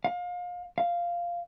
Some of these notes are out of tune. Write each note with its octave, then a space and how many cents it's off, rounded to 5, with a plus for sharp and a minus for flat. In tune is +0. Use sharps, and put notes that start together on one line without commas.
F5 +30
F5 -5